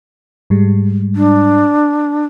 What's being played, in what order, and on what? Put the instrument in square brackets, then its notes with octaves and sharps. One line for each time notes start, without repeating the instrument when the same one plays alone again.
[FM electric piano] G#2 G3 G#3
[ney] D4